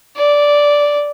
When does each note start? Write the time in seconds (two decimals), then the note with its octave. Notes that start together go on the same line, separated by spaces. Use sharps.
0.16 D5